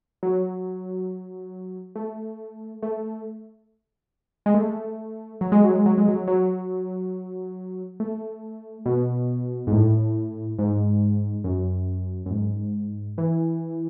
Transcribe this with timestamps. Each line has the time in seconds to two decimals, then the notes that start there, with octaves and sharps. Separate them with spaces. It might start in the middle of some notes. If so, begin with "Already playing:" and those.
0.23 F#3
1.96 A3
2.83 A3
4.46 G#3
4.54 A3
5.41 F#3
5.52 G#3
5.64 F#3
5.75 G#3
5.86 F#3
5.98 G#3
6.08 F#3
6.28 F#3
8.00 A3
8.86 B2
9.67 G#2
9.72 A2
10.59 G#2
11.44 F#2
12.26 F#2
12.31 G#2
13.18 E3